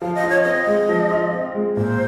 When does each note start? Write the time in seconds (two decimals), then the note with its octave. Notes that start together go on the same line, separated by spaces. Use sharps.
0.02 F3 F5
0.15 D#5
0.24 F4
0.29 C#5
0.42 C4 D#5
0.67 G#3
0.89 F3
1.11 F4
1.33 C4
1.55 G#3
1.77 A#2 C5